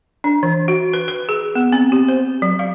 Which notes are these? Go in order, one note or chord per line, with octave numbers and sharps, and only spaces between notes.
D4
E3
F#4
B4
B4
G#4
B3
C4
G4
C5
F#3
F5